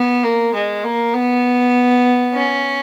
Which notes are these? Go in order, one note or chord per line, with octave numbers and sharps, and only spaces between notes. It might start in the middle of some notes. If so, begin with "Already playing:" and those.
Already playing: B3
A#3
G#3
A#3
B3
C#4